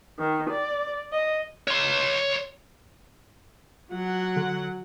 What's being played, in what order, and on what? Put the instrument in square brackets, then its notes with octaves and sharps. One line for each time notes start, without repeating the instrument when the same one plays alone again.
[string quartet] D#3
D5
D#5
[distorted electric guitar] C#5 C6
[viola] F#3 F#5
[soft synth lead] D3